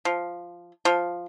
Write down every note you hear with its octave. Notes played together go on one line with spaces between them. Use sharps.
F3
F3